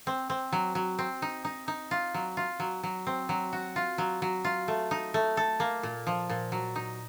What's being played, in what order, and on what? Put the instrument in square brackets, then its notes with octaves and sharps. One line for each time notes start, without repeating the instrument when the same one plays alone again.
[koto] C4
C4
F#3
F#3
C4
D#4
D#4
D#4
F4
F#3
F4
F#3
F#3
C4
F#3
F#4
F4
F#3
F#3
F4
A3
D#4
A3
A4
A#3
A#2
F3
A#2
F#3
D#4